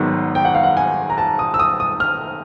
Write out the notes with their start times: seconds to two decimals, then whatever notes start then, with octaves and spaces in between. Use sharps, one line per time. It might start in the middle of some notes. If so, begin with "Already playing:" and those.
Already playing: G#1 G#2 D#3 F#3 B3
0.35 G5
0.45 F#5
0.55 F5
0.63 F#5
0.77 G#5
1.10 A#5
1.18 A5
1.39 D#6
1.54 E6
1.59 D#6
1.80 D#6
2.00 F6